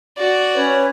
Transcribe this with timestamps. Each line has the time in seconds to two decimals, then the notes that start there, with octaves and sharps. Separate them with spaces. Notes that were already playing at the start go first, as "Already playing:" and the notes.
0.17 F#4 D5
0.54 C#4 B4 C#5